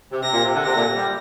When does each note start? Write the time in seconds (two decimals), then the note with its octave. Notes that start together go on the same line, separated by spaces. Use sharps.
0.12 C3
0.23 C3 A#6
0.33 A#2
0.44 C3
0.54 D3
0.65 C3 A#6
0.75 A#2
0.97 G3